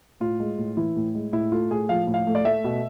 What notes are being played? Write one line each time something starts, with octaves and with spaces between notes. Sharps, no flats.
A2 F4
G#3
A2
E3 E4
A2
G#3
A2 E4
A3 F4
A2 G#4
F3 F5
A2
F5
A3
D5
A3 E5
B2